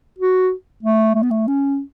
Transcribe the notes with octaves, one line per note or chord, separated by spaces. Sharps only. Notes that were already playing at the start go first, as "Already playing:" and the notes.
F#4
A3
A3
B3
A3
C#4